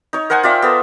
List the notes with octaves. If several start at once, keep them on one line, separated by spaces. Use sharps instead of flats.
D#4 C#5
A#4 C5 F#5 G#5
F4 D5 E5 G5
B3 A4